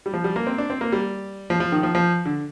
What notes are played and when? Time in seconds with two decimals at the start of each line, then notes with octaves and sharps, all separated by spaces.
0.06 G3
0.13 F3
0.24 G3
0.36 A#3
0.47 C4
0.58 D4
0.70 C4
0.81 A#3
0.92 G3
1.50 F3
1.60 F3
1.72 D#3
1.83 F3
1.95 F3
2.25 D3